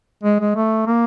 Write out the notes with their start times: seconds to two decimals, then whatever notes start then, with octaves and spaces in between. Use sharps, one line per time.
0.24 G#3
0.41 G#3
0.56 A3
0.87 A#3